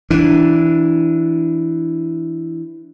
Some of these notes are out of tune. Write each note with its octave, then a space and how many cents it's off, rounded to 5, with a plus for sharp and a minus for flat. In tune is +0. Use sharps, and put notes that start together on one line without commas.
E3 +0 D4 -10